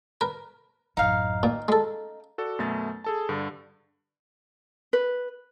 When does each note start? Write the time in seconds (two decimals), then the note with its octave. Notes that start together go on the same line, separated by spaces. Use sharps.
0.21 A#4 B4
0.97 A1 F#2 D#4 F5
1.43 A#2 C#4
1.68 G#3 A4
2.38 F#4 A4 D5
2.59 F#2 B2 A3 A6
3.04 G#4 A4 A5
3.29 G2 D3
4.93 B4